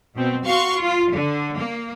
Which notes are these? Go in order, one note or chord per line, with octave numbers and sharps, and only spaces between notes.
B2 C4
F#4 F5 C6 C#6
F4
D3
A#3